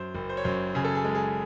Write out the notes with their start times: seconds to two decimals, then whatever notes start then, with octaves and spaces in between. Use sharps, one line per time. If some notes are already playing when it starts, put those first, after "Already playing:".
Already playing: F#2 C5
0.15 F#1
0.29 C5
0.37 C#5
0.44 F#2 C5
0.74 C#3 G#4
0.85 A4
0.95 G#4
1.04 G#3 A4
1.15 G#4